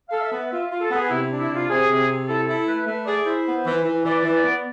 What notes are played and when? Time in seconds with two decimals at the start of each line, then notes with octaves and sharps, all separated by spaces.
0.09 A4 F5
0.21 E5
0.31 B3
0.50 F4 E5
0.70 F4
0.81 A4
0.90 B3 G#4
1.09 C3 E4
1.29 D4
1.39 E4
1.49 C3
1.54 F4
1.69 C3 G#4
1.88 C3
2.07 C3
2.27 E4 A4
2.46 E4 A4
2.66 A3 B4
2.86 A3 B4
3.06 G#4 D5
3.25 E4 C5
3.45 B3
3.65 E3
3.84 E3
4.04 E3 D5
4.23 E3
4.33 D5
4.43 B3